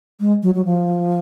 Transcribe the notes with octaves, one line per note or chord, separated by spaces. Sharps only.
G#3
F#3
F#3
F3